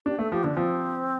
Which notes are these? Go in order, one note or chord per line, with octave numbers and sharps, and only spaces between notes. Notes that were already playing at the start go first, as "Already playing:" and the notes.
D4 G4
A3 A4
F3 G4
D3 D4
F3 C4